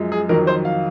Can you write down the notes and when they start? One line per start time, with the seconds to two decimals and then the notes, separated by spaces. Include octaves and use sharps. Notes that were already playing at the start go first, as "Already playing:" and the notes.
Already playing: F#2 F3 G#3
0.12 G#4
0.29 F2 D#3 F#3 A#4
0.47 C5
0.65 F5